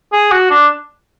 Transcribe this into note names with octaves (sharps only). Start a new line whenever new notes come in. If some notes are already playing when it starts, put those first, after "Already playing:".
G#4
F#4
D4